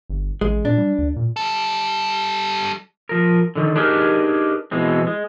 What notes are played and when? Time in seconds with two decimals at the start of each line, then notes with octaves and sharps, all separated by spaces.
0.10 G1
0.41 A1 G#3
0.65 A#2 D4
0.78 G3
0.99 D2
1.16 A#2
1.37 G3 A4
3.09 F3 A#4
3.55 D3 D#3
3.76 D4 D#4 G4 G#4 A#4 B4
4.71 B2 E3 G#3 C4
5.07 G#3